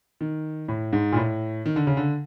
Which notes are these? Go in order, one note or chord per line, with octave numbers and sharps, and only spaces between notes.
D#3
A2
G#2
A#2
A2
D#3
D3
C#3
D3